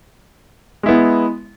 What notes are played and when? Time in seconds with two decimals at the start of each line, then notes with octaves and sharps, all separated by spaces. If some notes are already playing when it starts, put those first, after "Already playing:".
0.83 G#3
0.86 E4
0.89 B3